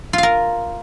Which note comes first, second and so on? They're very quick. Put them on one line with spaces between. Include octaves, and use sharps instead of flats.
F4 F5 A#4